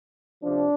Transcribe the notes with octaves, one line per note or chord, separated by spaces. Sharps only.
F2 C3 F3 D4